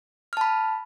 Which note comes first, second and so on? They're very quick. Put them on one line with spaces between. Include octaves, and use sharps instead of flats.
F6 A5 B5